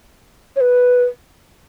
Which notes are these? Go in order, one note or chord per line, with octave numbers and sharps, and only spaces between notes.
C#5
B4